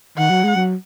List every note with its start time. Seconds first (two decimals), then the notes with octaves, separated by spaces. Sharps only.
0.18 D#3 F#5
0.30 F#3
0.43 G#3
0.56 F#3